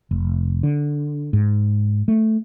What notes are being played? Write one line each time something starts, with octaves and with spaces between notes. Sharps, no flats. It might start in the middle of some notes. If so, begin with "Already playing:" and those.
F1
D3
G#2
A3